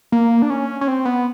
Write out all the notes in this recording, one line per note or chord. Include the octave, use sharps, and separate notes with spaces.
A#3
D4
C#4
C#4
C4
B3